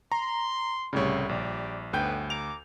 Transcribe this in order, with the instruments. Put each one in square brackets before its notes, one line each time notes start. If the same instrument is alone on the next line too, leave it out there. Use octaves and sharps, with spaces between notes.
[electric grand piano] A#5 [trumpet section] C6
[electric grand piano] C2 A2 C#3 [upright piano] G3 C#5
[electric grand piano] A#1 [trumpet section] G4 D5
[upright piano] G1 G5 G6 [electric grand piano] D2 [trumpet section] B3 D#4 B4
[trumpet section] A#5 D6 [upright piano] F7